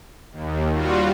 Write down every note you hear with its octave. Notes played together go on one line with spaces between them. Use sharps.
D#2
G3 F4 F#4